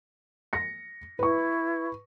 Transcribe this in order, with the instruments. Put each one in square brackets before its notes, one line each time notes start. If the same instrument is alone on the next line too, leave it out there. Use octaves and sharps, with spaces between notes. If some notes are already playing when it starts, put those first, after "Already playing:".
[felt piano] A#6 C#7
[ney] E4 [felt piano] B4 C#6